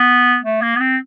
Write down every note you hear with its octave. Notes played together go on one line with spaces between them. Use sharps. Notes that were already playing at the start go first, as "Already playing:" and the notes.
Already playing: B3
A3
A#3
B3
C4